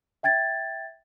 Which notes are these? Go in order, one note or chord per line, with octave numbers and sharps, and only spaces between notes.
E5 G5 G#6 A6